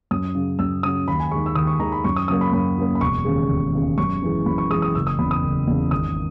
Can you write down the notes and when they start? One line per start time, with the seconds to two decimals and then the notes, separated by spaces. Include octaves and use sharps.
0.11 F#2 D#6
0.35 C#3 F#3
0.59 F#2 E6
0.83 C#3 F#3 D#6
1.08 D#2 B5
1.20 G#5
1.31 G#3 C#6
1.36 D#3
1.46 E6
1.55 D#2 D#6
1.67 C#6
1.80 D#3 G#3 A#5
1.92 B5
2.04 F#2 C#6
2.16 D#6
2.28 C#3 F#3 A#3 D#6
2.41 B5
2.52 F#2 B5
2.77 C#3 F#3 A#3
2.95 B5
3.01 E1 C#6
3.25 D#2 C#3 G#3
3.50 E1
3.74 D#2 C#3 G#3
3.98 F#2 C#6
4.22 E3 G#3
4.46 F#2 B5
4.58 C#6
4.70 G#3 D#6
4.74 E3
4.82 D#6
4.95 F#1 E6
5.07 D#6
5.19 E2 C#3 B5
5.31 D#6
5.43 F#1
5.67 E2 C#3
5.91 G#1 D#6